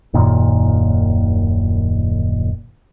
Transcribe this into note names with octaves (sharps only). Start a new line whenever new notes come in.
D#1 F#2 A#2 D#3